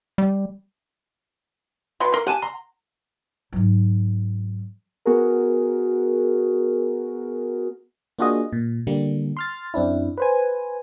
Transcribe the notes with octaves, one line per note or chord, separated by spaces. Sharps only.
G3
B2 B4 C6
A#4 C6
G4 F#5 G#5 A5
A#5 C6
G#2 F#3
B3 F#4 G#4 A#4
A#3 D4 F4 F#4 G#4 D#5
A#2
D3 G3 A#3
C6 F6 A6
F#2 C4 D4 E4
B4 C5 G#5